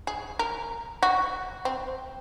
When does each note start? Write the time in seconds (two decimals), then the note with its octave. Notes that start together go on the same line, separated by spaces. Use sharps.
0.07 G#4
0.39 A#4
1.03 F#4
1.65 C4